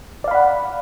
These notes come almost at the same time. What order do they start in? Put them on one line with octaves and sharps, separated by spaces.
D5 F5 B5 F#5